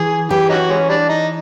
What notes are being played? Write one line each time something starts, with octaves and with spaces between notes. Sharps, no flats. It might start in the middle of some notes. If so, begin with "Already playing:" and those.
Already playing: E3 G#4
E3 G4
C#4 D#4 F#4
G#3 C#4
G3 D4
D#4